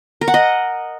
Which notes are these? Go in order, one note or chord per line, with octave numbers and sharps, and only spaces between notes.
A#4
F#5
D#5